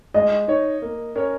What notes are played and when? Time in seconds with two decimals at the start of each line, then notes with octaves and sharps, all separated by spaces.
0.14 G#3 D#5
0.48 D#4 C#5
0.82 A#3
1.15 C#4 A#4 C#5